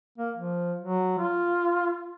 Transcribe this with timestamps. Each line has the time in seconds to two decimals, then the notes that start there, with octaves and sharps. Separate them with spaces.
0.18 A#3
0.36 F3
0.78 F#3
1.18 F4